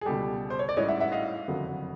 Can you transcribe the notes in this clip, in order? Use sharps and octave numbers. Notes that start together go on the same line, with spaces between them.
G#4
C#2 B2 G3 G4 A4
C5
C#5
D5
A1 G#2 E3 G3 C#5 D#5
E5 F#5
E5 F#5
D#5 F5
F#1 F2 D3 F#3